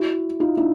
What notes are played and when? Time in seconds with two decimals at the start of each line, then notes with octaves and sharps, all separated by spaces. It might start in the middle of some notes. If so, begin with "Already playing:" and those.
Already playing: E4 F#4
0.40 D#4 F4
0.57 D4 E4